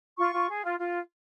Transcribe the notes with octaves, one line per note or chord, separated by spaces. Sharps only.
F4 C#6
F4
G#4
F4
F4